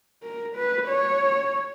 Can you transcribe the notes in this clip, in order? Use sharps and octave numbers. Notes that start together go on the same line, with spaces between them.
A#4
B4
C#5